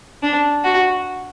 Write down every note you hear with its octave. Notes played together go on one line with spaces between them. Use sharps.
D4
F#4